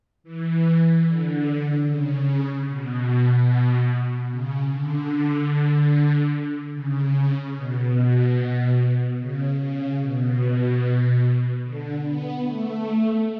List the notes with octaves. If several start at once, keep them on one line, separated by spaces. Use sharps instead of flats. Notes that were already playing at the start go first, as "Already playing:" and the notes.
E3
D3
C#3
B2
C#3
D3
C#3
B2
C#3
C#3
B2
D3
B3
A3